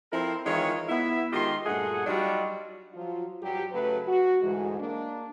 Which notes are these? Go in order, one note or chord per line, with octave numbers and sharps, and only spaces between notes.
F3 C4 E4 A4 A#4 C5
D#3 E3 G#3 F4 C#5
B3 E4 E5
D#3 G#3 F4 G4 D#5 C6
G2 A#2 A3 G#4 F#5
F#3 G3 D4 D#4 F4 F#4
F3 F#3 F4
G2 F#3 G3 G4
C#3 F#3 A3 B4
F#4
D2 G#2 E3 G#3
A#3 D4